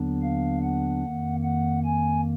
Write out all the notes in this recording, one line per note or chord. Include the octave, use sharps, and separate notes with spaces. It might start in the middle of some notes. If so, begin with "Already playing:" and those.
Already playing: D#2 D3 F#3 B3 D4
F5
F#5
F2 D#3 A#3
F#5
G#5